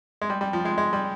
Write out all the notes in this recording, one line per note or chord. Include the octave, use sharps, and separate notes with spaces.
G#3
G3
G3
F3
G#3
G#3
G3